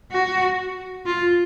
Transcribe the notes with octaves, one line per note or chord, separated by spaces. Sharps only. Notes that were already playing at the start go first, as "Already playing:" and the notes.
F#4
F4